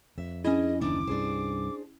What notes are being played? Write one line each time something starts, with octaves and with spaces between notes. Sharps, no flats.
F2 E5
C#4 D4 E4 G#4 D#5
F#1 D#2 E3 D4 D#4 D6
C2 G2 D4 G#4 C5